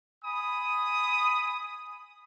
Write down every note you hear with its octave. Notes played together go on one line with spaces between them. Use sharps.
G#5 B5 D#6